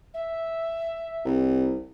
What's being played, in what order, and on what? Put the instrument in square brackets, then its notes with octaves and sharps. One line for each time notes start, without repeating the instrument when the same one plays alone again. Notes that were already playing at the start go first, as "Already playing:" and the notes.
[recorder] E5
[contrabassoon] C2